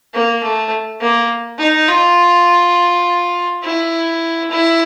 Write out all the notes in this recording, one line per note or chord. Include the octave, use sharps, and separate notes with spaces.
A#3
A3
A#3
D#4
F4
E4
E4